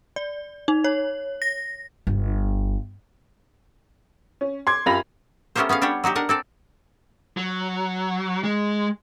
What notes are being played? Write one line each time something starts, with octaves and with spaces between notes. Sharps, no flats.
D5
D#4
C#5
A#6
G1
C#4
C6 D6 G#6
F#2 F4 G4 B5 A#6 F7
A3 B3 C#4 G4 A#4 C5
B3 C#4 G#4 F5
G3 D4 G4 C#5 F#5
F#3 D#4 F#4 G4
D4 A#4 F#5
C4 A4 D5
F#3
G#3